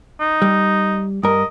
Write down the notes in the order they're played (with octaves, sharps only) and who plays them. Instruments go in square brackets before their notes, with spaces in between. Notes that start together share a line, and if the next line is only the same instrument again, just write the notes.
[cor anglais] D#4
[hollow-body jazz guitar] G3
[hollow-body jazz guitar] G2 A#4 [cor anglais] D#5